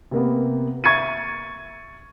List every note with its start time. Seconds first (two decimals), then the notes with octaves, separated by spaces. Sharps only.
0.11 C3 A#3 B3
0.84 E5 C#6 G#6 A6 C#7 D#7